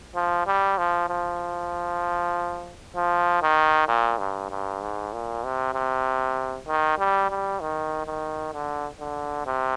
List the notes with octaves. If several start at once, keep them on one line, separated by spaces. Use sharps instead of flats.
F3
G3
F3
F3
F3
D#3
A#2
G2
G2
G#2
A#2
C3
C3
D#3
G3
G3
D#3
D#3
D3
D3
C3